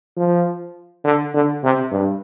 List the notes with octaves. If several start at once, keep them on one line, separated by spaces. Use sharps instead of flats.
F3
D3
D3
C3
G2